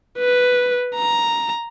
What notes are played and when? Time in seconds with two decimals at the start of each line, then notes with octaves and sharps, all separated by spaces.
0.18 B4
0.95 A#5